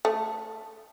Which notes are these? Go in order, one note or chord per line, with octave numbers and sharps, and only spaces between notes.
A3